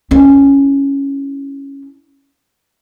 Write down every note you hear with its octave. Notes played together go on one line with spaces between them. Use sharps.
C#4 E4